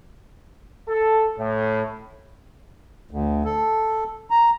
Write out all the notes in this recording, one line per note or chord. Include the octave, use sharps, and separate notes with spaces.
A4
A2
D2
A4
A#5